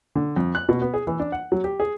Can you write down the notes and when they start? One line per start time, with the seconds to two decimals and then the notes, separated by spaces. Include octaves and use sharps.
0.15 D3
0.36 F2
0.55 F#6
0.69 B2
0.82 B3
0.94 G#4
1.07 E3
1.20 D4
1.32 F#5
1.52 F#3
1.64 G4
1.80 G#4